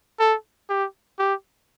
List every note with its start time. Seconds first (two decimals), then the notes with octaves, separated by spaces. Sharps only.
0.20 A4
0.70 G4
1.19 G4